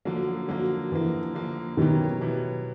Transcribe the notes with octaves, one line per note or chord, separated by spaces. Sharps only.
D3 F3 F#3 A#3
D3 F3 F#3 A#3
D3 E3 F3 A#3
D3 F3 A#3
B2 D#3 F#3 B3 E4 G4
B2 F#3 B3 E4 G4